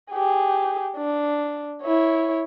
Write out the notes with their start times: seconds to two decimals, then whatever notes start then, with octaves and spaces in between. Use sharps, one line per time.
0.12 G4 G#4
0.97 D4
1.83 E4 C#5